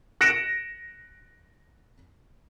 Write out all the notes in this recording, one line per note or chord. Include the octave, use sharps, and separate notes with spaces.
F#6 A#6 C#7 D7 E7